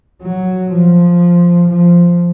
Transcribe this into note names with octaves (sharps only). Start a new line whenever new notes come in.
F#3
F3
F3